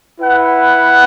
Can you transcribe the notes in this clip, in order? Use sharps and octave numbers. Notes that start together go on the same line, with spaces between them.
E4 B4 F#5